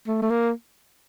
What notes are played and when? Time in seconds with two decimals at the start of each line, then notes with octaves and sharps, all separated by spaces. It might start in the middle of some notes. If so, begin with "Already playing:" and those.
0.07 A3
0.22 A3
0.30 A#3